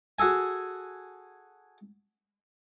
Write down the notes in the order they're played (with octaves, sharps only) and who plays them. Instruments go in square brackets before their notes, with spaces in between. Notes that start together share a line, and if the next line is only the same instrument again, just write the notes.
[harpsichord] F#4 G#4 A4 G#5